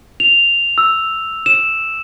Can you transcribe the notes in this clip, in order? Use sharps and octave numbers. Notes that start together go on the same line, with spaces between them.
F7
E6
E7